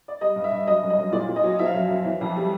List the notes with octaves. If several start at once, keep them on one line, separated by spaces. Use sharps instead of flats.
D5
G3 D#5
G2
E5
G2
F#3 D#5
F#2
D#5
F#2
A#2 D5
A#2
D#5
F#3
F3 E5
F5
F#2 E5
F#2
E3
F2
G3